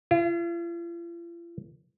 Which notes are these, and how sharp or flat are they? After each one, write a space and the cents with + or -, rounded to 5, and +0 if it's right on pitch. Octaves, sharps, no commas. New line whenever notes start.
F4 -45